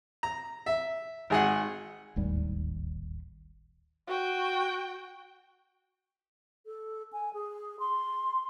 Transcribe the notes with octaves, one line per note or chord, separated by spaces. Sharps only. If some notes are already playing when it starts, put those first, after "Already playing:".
A#5
E5
G#1 G#4 F#5
D1 G#1 D#2 G3
F#4 G5
A4
G#5
G#4
C6